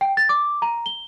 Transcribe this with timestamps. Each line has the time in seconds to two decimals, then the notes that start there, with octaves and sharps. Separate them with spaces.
0.01 G5
0.17 A6
0.29 D6
0.62 A#5
0.86 G7